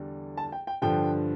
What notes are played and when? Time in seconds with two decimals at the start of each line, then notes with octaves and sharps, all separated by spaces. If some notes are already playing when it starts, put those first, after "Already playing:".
Already playing: E2 D3 G3
0.37 A5
0.52 G5
0.67 G5
0.82 G2 D3 F3 G5